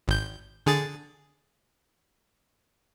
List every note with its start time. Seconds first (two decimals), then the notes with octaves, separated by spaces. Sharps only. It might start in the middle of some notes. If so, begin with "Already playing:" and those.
0.08 G#1 G6
0.66 D3 G#4 A6